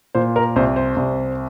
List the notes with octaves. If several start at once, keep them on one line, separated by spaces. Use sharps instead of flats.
A#2 C5
A#4
C2 C5
C5
C2